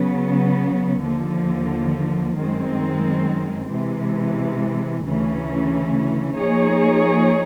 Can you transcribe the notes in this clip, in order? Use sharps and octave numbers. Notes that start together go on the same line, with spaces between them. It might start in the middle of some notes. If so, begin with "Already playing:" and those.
Already playing: C#3 F#3 B3
D#2 D3 F3
F#2 D#3 G#3 C4
C3 E3 G#3
D2 C#3 E3 A3 C#4
F3 A#3 D#4 G#4 C#5